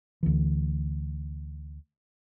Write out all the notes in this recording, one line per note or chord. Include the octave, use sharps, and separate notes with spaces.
D2 E3